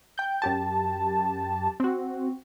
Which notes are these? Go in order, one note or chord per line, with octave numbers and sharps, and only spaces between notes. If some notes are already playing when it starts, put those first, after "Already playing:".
G5 G6
F#2 G4 A5
C4 F#4